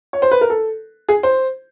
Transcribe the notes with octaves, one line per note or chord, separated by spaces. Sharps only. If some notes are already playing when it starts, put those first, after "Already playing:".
C#5
C5
B4
A#4
A4
G#4
C5